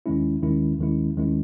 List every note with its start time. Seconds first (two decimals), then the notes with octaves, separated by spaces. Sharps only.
0.06 D#2 D#3 G#3 C#4 E4
0.43 D#2 D#3 G#3 C#4 E4
0.79 D#2 D#3 G#3 C#4 E4
1.17 D#2 D#3 G#3 C#4 E4